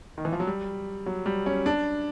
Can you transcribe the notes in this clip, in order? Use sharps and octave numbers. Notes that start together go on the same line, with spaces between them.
D#3
E3
F3
F#3
G3
F#3
G3
C#4
D4